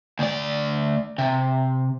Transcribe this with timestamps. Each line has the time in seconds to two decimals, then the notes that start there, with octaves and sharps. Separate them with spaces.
0.19 D2 D5
1.18 C3